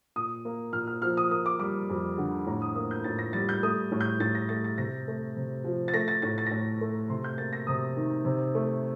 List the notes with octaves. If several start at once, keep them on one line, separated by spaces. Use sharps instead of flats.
A#2 D#6
A#3
A#2 F6
F6
F3 F6
D#6
A#3 D#6
D6
G3 D6
F2
D3
A2 A#5
D#6
A#3 D#6
G6
A2 A6
A#6
G3 A6
G6
A3 D#6
A2
G6
A2 A6
A#6
A3 A6
A6
C3 A#6
A3
C3
F3
A6
A3 A#6
A6
A2 A6
A6
A#6
A2 A6
A3
C3 C6
G6
A#3 A6
A#6
C3 D#6
D#3
C3
A3